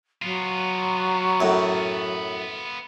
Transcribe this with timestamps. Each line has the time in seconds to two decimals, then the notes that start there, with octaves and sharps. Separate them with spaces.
0.22 F#3 B3 F4
1.40 F#2 A2